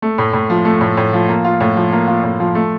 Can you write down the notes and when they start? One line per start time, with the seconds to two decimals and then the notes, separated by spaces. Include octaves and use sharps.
0.02 A3
0.18 A2
0.33 A2
0.50 F3
0.65 A3
0.81 A2
0.97 A2
1.13 F3
1.29 A#3
1.45 F4
1.60 A2
1.77 F3
1.92 A#3
2.07 F4
2.24 A2
2.40 F3
2.55 A3